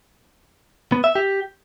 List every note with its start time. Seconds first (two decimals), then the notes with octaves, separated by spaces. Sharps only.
0.92 B3
1.04 E5
1.15 G4